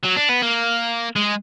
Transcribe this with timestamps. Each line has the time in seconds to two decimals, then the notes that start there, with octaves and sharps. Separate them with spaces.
0.05 F#3
0.17 D4
0.30 B3
0.42 A#3
1.16 G#3